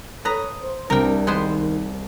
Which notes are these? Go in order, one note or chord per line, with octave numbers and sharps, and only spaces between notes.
A4 B4 C#5 A#5 D#6
C5
C2 E3 C4 D4 A#4 G5
D#3 G#3 B3 C5